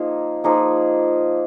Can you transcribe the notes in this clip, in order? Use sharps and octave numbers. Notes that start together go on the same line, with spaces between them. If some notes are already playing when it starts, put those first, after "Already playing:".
Already playing: F3 A#3 D#4 G#4
F3 A#3 D#4 G#4